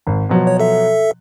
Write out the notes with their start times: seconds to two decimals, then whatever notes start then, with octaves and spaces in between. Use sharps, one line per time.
0.07 G#1
0.29 B2 F3 F#3
0.47 C#5
0.60 A4 E5